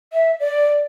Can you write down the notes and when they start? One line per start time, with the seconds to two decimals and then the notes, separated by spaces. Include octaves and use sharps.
0.13 E5
0.40 D5